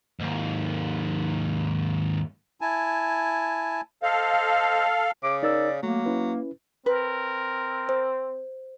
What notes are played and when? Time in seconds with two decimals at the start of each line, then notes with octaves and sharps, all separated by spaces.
0.20 D#2 G#2
2.61 E4 G#5 A5
4.03 A4 C5 D#5 F5
5.24 C#3 D6
5.43 D#4 A#4 D5 E6
5.83 F#3 A3 A#3
6.06 C#4 E4 B4
6.86 C4 A#4 B4
7.89 C5